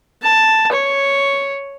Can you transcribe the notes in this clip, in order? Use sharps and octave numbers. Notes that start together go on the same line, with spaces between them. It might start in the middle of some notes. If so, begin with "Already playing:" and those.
A5
C#5